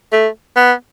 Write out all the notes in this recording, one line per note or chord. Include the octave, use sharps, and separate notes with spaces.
A3
B3